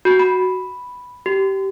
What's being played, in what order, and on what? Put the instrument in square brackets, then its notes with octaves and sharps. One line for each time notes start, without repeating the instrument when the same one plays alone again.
[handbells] F#4
B5
G4